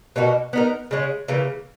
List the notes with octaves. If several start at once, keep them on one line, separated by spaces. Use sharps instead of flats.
B2 A#3 D#4 F#4
B3 D#4 A#4
C#3 G#3 C#4
C#3 E3 A#3